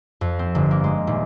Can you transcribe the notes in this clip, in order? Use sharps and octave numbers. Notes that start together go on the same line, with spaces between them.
F2
C4
G1
A#3
G#3
D#1